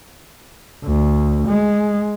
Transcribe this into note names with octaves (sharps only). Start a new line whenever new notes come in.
D2
G#3